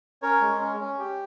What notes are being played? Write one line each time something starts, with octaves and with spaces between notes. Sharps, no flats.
C#4 A#4 C#5
G#3
C#4
C#4
G4